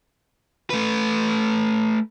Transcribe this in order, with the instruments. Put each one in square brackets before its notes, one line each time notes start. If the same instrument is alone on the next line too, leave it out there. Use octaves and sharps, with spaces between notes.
[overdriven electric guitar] A3 B4